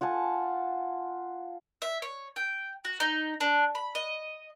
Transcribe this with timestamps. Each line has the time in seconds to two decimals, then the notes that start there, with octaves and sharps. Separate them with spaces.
0.01 F4 F#5 G#5 A5
1.82 E5
2.02 C#5
2.36 G5
2.85 F#4
3.00 D#4
3.40 D4
3.75 B5
3.95 D#5